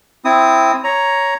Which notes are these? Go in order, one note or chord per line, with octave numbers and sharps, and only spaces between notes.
C4 E4 D#6
C#5 A#5